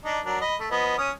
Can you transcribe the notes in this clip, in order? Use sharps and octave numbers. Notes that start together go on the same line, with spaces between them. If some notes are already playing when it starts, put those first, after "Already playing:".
D4 D#4
F#3 D4 A#4
D#5 B5
A3
F3 B3 D#5
C#4 D#6